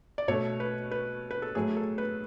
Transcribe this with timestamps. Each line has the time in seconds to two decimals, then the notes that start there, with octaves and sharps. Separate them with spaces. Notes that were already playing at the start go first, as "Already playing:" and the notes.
0.18 D5
0.28 B2 A3 C#5
0.60 B4
0.91 B4
1.31 B4
1.42 A4
1.55 A2 F#3 A3 G#4
1.77 A4
1.98 B4